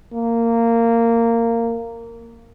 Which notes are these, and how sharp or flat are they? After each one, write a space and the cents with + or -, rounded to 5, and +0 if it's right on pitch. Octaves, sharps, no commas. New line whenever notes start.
A#3 -15